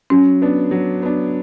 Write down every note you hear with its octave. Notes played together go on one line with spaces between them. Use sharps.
F#3 C#4
B3 D4
F#3
B3 D4